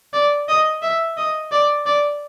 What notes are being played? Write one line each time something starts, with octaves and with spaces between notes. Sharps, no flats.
D5
D#5
E5
D#5
D5
D5